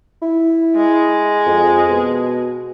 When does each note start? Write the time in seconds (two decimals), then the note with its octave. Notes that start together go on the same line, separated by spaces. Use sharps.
0.22 E4
0.77 G#3
1.47 F2
1.89 B2